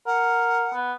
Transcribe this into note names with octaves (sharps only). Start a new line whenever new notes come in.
A#4 F#5
B3